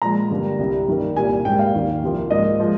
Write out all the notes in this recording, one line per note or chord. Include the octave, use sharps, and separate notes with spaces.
A#2 F3 G#3 A#5
G2 D3 G3 A#3
C2 C3 G3
G2 D#3 G3 A#3
C2 A#2 G3 A#3 G#5
G#2 G3 A#3 G5
F5
D#2 D#3 A#3
C2 C3 F3 A#3
G#2 F3 A#3 D#5
F3 G#3